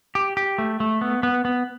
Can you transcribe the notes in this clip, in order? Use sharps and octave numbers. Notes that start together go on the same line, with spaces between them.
G4
G4
A3
A3
B3
B3
B3